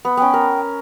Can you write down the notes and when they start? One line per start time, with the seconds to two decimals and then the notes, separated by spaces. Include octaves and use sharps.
0.05 B3
0.17 B3 C#4 G5
0.34 A#4